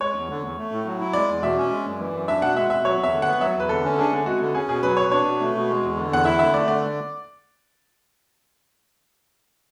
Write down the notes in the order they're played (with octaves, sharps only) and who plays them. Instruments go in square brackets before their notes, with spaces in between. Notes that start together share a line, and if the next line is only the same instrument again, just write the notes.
[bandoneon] G#3 [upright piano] C#5
[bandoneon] E2
D3
E2
A3
A2
F#3
E4
[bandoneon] G#3 [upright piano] D5
[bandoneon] E2
[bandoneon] B2 [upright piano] E5
[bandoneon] C#4
G#3
F#2
E3
F#2
[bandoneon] D4 [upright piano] E5
[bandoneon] B2 [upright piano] F#5
[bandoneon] G#3 [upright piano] E5
[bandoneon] B2 [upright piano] E5
[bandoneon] F#3 [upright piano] C#5
[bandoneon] E2
[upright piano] E5
[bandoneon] D3
[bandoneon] B3 [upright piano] F#5
[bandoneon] F#3 [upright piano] E5
[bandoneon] E2 [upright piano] B4
[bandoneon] D3 [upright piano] A4
[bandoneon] C#4
[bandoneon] D4 [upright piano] G#4
[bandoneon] D3
[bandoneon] G#3 [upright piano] F#4
[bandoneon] D3
[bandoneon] C#4 [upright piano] G#4
[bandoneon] B2 [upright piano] G#4
[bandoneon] F#3 [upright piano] B4
[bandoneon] B2 [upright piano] C#5
[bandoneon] D4 [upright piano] C#5
[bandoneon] B2
A3
B2
G#3
E2
D3
[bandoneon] E2 [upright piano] F#5
[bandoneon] E4 [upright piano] E5
[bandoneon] D3 [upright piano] E5
[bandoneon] A3 [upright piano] D5
[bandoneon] D3 [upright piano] D5